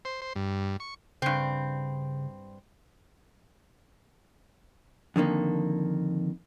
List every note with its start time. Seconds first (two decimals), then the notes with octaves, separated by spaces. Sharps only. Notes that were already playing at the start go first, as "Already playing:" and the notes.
0.05 C5
0.22 C5
0.35 G2
0.80 C#6
1.22 G2 C#3 C4
5.16 F2 D3 D#3 A#3